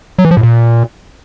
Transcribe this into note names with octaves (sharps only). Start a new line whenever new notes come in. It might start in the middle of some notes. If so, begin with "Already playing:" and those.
F#3
E3
F3
A2
A#2